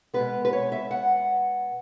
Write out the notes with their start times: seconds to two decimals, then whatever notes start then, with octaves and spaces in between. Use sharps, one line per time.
0.14 B2 G#3 B3 B4
0.45 B4
0.53 C#5
0.72 E5
0.91 F#5